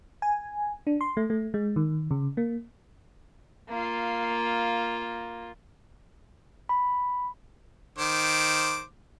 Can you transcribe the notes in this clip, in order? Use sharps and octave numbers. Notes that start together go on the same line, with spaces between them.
G#5
D4
C6
A3
A3
G#3
D#3
C#3
A#3
A#3 F4
B5
D#3 C5 D6